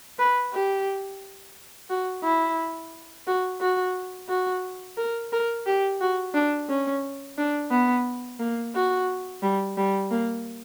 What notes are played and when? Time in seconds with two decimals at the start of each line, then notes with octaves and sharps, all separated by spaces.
0.19 B4
0.53 G4
1.90 F#4
2.23 E4
3.27 F#4
3.61 F#4
4.29 F#4
4.97 A#4
5.32 A#4
5.66 G4
6.01 F#4
6.34 D4
6.69 C#4
7.38 D4
7.71 B3
8.39 A#3
8.75 F#4
9.42 G3
9.77 G3
10.11 A#3